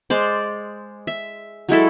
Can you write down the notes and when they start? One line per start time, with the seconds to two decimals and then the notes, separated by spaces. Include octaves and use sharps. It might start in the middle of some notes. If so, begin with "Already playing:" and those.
0.10 G#3 C5 D5
1.07 E5
1.69 F#3 G#3 E4 A4